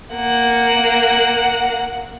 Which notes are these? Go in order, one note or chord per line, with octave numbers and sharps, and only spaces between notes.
A#3 F#5